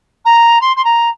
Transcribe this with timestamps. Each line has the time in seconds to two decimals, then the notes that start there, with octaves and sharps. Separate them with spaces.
0.25 A#5
0.61 C6
0.76 C6
0.84 A#5